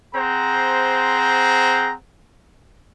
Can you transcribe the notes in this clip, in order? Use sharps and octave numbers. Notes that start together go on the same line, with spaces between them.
C4 G#4 C5 F#5 A#5